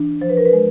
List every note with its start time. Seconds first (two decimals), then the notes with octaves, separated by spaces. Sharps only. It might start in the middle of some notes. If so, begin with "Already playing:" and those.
Already playing: E3 D4
0.21 F3 C5
0.29 B4
0.37 A#4
0.45 B4
0.53 G#3